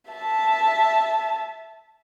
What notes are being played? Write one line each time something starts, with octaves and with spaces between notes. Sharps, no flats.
E5 A5